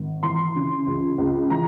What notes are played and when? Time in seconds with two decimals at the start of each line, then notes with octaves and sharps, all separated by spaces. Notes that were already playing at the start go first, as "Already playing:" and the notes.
Already playing: G#1
0.23 E3 C6
0.55 C#3
0.87 C#2
1.18 C#2
1.50 E3 A#5